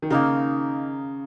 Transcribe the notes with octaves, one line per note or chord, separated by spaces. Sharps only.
D#3
C#3 A#3 D#4 A#4